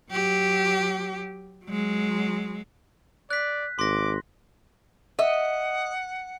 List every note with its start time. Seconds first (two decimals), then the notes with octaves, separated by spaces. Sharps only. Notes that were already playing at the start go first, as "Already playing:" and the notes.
0.11 F#3 G4
1.65 F#3 G#3
3.30 D5 F#6 B6
3.79 G#1 C6 D6 A#6
5.19 D#5 E5 F#5